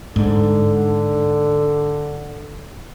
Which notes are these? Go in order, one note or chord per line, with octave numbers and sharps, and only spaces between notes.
G#2 D3